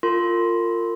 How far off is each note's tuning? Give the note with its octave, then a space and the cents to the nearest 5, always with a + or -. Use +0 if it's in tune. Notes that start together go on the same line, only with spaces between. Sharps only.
F4 +0 A#4 -35 C6 +0